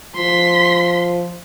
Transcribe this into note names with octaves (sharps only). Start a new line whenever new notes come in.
F3 C6 B6